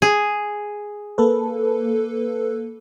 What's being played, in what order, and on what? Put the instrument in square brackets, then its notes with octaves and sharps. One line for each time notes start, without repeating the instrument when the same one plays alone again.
[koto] G#4
[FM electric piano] A#3 A4 B4